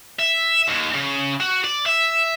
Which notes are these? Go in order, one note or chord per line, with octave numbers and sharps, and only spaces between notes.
E5
D#2
C#3
F#4
D5
E5